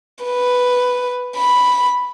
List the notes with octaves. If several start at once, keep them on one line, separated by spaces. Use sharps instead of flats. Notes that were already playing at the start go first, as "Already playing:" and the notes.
B4
B5